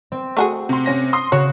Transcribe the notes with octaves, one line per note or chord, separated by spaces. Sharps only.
C4
A3 F#4 G#4
C3 C6
C3 C#4 A#6
C6 D#6 C7
C#3 F#4 C#5